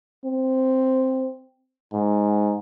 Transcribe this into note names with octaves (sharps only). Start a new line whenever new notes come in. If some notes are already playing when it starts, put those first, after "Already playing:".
C4
G#2